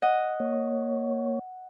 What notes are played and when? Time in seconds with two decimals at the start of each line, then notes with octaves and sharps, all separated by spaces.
0.02 D#5 F#5
0.40 A#3 C#5